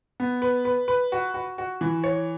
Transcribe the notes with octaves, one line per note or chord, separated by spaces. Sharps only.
B3
B4
B4
B4
F#4
F#4
F#4
E3
C#5